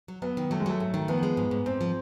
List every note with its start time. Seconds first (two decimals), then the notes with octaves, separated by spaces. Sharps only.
0.08 F#3
0.22 F#3 B3
0.37 D#3
0.51 F#3 A3
0.60 G#3
0.66 F#3 A3
0.80 G#2 A3
0.94 D#3
1.08 F3 B3
1.23 G#3
1.37 G#2
1.51 G#2
1.66 G#2 C4
1.81 F3